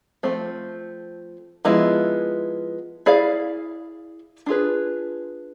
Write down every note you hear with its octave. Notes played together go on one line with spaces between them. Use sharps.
F3 A3 C4
F3 G#3 B3 E4
E4 G#4 D5 F5
D4 F4 G#4 B4